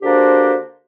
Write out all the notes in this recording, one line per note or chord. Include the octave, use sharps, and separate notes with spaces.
D3 A#3 D4 F#4 G4 C5